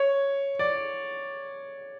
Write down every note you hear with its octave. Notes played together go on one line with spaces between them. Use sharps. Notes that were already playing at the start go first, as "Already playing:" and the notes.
Already playing: C#5
D5